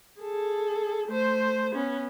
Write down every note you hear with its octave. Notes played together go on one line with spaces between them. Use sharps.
G#4 A4
A3 C5
B3 C#4